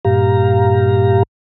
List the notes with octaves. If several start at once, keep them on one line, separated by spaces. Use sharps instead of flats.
G2 A#2 G4 F5 A#5